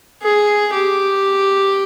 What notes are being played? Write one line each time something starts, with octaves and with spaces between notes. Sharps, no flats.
G#4
G4